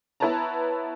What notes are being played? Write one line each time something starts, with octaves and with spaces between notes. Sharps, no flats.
B3 E4 B4 C#5 A5 A#5